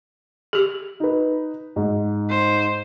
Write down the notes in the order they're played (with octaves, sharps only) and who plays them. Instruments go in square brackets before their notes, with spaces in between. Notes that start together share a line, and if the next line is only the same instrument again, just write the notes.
[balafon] G4 G#4
[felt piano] D#4 B4
G#2
[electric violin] C5